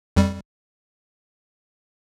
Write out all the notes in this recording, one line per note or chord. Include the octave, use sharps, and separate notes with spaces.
F2 G3